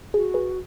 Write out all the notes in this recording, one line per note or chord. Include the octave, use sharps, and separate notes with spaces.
F#4 G#4
G#4 B4